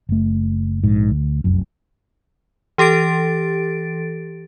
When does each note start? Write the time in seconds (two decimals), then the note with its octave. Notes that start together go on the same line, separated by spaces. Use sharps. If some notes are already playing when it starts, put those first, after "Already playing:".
0.09 F#1 A3
0.84 A#1 G#2
1.11 D2
1.44 F1 C2 F#2
2.78 E3 G4 A4 A6 D7